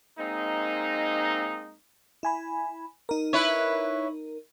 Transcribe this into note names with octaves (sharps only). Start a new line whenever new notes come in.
G#3 A#3 C4 D#4
E4 G#5 B5
D#4 A#4
E4 B4 C#5